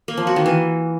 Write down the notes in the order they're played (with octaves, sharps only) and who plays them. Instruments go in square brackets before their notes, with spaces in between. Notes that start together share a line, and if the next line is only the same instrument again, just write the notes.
[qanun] A#3
F3
F#4
D#3
E3